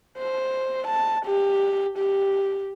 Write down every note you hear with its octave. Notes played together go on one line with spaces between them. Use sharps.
C5
A5
G4
G4